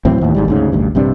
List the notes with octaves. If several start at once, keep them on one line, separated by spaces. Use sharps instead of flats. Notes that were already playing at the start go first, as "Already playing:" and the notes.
A2 E3 F#3 C4
D#2 A2
G#1 G#2 G3
D2 G#2 C#3
A1 D2 G2
A#1 G2 C3 D4